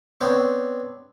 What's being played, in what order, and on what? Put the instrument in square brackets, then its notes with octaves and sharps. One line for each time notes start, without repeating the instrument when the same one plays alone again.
[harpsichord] B3 C4 D4 C5 C#5